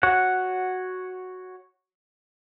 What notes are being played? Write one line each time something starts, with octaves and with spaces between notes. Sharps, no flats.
F#4 C#5 F#5